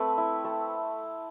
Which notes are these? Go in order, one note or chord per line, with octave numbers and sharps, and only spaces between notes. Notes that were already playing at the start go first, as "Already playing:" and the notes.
Already playing: A3 C4 B4 B5
E4
A3